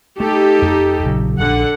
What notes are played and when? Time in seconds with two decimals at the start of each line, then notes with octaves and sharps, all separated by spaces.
0.20 A3 D#4 G4 A4
0.62 F2 A3
1.04 A#1 C#3 F#3
1.39 D1 A#1 D3 F#5